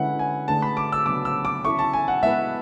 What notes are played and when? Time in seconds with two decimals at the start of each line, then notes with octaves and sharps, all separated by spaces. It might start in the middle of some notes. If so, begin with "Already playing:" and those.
Already playing: D3 G#3 C#4 E4 B4 F#5
0.19 G#5
0.48 D3 A3 D4 G#4 B4 A5
0.62 B5
0.77 D6
0.92 E6
1.06 C#3 F#3 B3 D4 D6
1.25 E6
1.45 D6
1.65 C#4 E4 A4 E5 C#6
1.79 A5
1.93 G#5
2.08 F#5
2.23 G#3 B3 E4 B4 E5